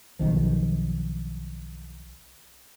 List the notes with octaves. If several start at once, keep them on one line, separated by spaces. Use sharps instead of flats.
B1 D#3 F3